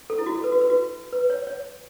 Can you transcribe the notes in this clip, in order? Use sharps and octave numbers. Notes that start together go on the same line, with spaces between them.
A4
E4
F#4
A4
B4
F#4
B4
F#4
B4
C#5
C#5